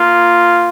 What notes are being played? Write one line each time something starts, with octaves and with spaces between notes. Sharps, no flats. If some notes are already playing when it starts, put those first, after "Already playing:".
Already playing: A#3 F4